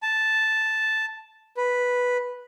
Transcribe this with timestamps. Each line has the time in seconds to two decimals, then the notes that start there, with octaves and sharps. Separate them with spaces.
0.03 A5
1.57 B4